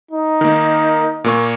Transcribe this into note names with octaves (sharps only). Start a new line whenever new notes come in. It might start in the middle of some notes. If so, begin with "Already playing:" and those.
D#4
D#3 A#3
A#2 A#3 C#6